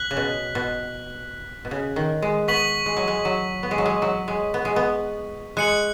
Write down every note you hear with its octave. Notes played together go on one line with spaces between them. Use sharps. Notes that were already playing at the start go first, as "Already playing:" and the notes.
Already playing: F#6 B6 F#7
C#3
B2
B2
B2
C#3
D#3
G#3
B3 C#6 B6 F#7
G#3
F#3
G#3
F#3
B3
G#3
F#3
G#3
F#3
G#3
B3
G#3
B3
G#3 F#6 C#7 F#7